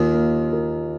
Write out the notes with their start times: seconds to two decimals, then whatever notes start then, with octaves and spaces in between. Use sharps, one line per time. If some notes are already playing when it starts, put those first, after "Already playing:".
Already playing: D#2 D#3 A#3 F4 A#4
0.14 A#3
0.53 F4 A#4